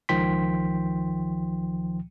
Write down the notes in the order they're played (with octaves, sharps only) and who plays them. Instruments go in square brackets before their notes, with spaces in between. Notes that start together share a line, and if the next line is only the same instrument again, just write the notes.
[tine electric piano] C#2 D#3 F3 G5 C6 B6